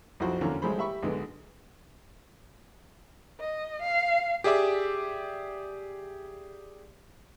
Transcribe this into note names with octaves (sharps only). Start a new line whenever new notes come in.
B1 F2 F3 E4 F#4 C5
E2 D3 A#3 C#4 F#4
A1 G3 G#3 G#4 C5 B5
G4 E5 B5 C#6
B1 G#2 D3 G#3 B3
D#5
F5
G4 G#4 D5 E5 D6